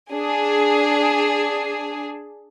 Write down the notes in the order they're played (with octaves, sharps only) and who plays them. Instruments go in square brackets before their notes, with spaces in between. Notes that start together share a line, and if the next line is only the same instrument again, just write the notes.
[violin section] D4 G#4